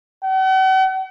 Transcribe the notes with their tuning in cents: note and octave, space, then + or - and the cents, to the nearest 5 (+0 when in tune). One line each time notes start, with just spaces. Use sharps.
F#5 +45